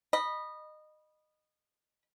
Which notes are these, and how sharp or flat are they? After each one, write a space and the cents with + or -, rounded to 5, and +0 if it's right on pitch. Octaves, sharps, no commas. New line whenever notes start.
D#5 -20 B5 -15